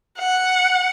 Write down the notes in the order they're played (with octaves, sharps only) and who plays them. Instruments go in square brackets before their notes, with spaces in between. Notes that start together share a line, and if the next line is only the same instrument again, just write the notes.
[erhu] F#5